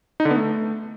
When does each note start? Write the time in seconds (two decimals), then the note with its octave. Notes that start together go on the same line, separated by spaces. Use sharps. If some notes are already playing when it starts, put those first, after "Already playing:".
0.20 D#4
0.25 D3
0.31 B3
0.36 A3